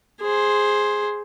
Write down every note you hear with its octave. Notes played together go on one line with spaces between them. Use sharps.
G#4 C5